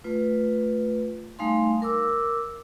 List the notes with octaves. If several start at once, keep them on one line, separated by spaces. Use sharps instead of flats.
A3 F4 B4
G3 A3 D#4 F5 G#5 C6
A#4 D6 E6